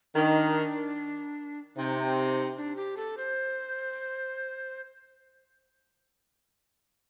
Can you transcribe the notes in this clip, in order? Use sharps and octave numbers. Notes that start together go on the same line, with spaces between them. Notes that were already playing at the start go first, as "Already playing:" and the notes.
D#3 D4
C3 D#4
D4
G4
A4
C5